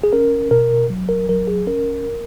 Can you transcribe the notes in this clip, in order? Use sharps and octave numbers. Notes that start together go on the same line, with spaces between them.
G#4
C#4 A#4
B2 A#4
F#3
A#4
F#3 A#4
G#4
C#4 A#4